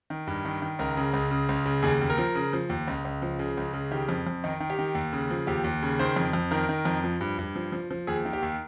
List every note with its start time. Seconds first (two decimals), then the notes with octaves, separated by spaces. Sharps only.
0.10 D#3
0.27 G2
0.45 D#3
0.62 D#3
0.79 C#2 A#4
0.97 C#3
1.13 C#2
1.31 C#3
1.49 C#2
1.66 C#3
1.83 D#2 G#4
2.01 D#2
2.09 A#4
2.18 F3
2.35 C#3
2.53 F3
2.69 D#2
2.87 C#2
3.05 C#2
3.22 F3
3.39 C#3
3.57 C#2
3.73 C#3
3.91 D#3 G4
4.09 F2
4.27 F2
4.44 D#3 D#4
4.60 D#3
4.70 G4
4.79 D#3
4.95 D#2
5.13 C#3
5.31 F3
5.47 D#2 G4
5.64 D#2
5.83 C#3
5.99 D#3 C5
6.16 F2
6.33 F2
6.51 D#3 A#4
6.69 D#3
6.85 F2
7.04 F3
7.21 G2
7.39 G2
7.56 F3
7.72 F3
7.91 F3
8.07 D#2 G#4
8.25 D#3
8.33 G4
8.42 D#2